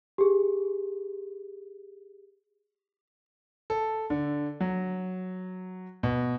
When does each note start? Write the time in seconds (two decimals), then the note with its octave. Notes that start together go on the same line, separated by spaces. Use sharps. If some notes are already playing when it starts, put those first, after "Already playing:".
0.18 G4 G#4
3.70 A4
4.10 D3
4.60 F#3
6.03 B2